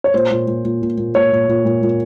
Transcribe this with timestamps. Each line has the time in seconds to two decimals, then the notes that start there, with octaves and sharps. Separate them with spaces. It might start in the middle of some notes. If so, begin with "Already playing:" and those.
0.04 C#5
0.14 A#2 C5
0.31 A#2
0.47 A#2
0.64 A#2
0.82 A#2
0.97 A#2
1.15 A#2 C#5
1.32 A#2
1.48 A#2
1.65 A#2
1.82 A#2